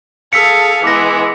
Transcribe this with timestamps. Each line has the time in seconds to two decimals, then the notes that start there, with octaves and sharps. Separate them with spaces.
0.33 G#4 A4 F5 E6 B6 C#7
0.84 E3 G#3 B3 D6 A#6